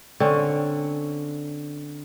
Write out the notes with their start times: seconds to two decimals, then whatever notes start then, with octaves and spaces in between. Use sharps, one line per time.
0.20 D3 C4 C#4